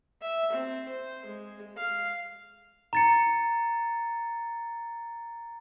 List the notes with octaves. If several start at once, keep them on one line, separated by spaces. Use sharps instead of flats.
E5
C4
C5
G#3
F5
A#5 A6 C#7